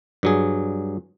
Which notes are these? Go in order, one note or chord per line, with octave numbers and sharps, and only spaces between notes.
G2 F#3 G#4